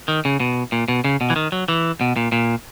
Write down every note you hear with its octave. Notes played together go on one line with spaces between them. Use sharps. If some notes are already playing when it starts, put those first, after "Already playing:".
D#3
C#3
B2
A#2
B2
C#3
B2
E3
D#3
F#3
E3
B2
A#2
A#2